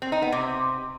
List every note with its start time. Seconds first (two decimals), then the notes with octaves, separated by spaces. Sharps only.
0.02 C4
0.12 D#4
0.22 B3
0.32 C3